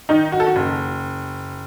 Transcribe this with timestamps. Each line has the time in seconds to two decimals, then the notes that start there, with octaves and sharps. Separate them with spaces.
0.09 D#3 D#4
0.32 F#4
0.40 A4
0.47 F#4
0.56 F#1